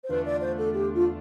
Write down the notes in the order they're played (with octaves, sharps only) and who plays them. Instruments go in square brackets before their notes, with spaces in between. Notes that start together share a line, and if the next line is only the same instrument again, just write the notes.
[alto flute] C5
[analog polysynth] E2 D3 A3 D4 F4 [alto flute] B4
[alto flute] D5
C5
A4
G4
F4